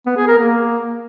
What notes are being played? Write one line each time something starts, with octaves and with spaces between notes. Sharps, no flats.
B3
G#4
A#4
A#3